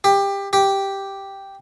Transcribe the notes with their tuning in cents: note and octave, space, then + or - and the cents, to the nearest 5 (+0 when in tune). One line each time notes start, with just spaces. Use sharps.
G4 +20
G4 +0